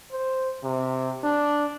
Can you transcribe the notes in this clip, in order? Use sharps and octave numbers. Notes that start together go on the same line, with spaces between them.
C5
C3
D4